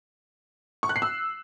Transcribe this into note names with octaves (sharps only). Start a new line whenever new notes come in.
C#6
F#6
C7
E6